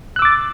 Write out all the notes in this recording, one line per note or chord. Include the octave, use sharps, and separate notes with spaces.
D6 E6 F#6 A6